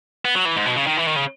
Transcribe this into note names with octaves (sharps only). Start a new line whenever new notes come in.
B3
F#3
E3
G#2
B2
C#3
D#3
E3
D#3
C#3